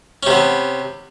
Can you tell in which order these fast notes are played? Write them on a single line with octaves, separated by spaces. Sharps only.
C#4 C3 B3